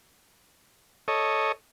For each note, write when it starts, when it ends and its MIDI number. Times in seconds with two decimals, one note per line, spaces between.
1.08 1.52 69
1.08 1.52 73
1.08 1.52 75